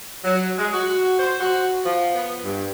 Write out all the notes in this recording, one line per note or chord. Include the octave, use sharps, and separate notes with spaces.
F#3
G#3
F#4
C5
F#4
F3
B3
G2